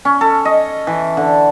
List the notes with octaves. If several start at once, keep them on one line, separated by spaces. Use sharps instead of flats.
C#4
A4
D#5
E3
D3